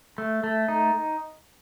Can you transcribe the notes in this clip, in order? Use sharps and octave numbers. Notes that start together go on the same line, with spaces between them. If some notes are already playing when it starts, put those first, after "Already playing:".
A3
A3
D#4